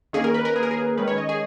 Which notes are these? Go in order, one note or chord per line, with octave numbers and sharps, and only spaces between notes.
D#3 A#3 C#4 G#4
A#4
B4
A#4
G#4
A#4
G#4
D#3 G#3 C#4 B4
C#5
D#5
G#4